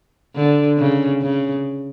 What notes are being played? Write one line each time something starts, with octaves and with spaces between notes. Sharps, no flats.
D3
C#3
C#3